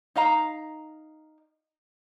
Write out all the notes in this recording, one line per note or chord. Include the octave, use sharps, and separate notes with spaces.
D#4 D#5 F5 A#5